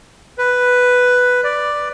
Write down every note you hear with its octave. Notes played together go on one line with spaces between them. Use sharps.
B4
D5